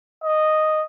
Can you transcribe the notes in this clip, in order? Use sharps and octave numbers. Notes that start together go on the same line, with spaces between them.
D#5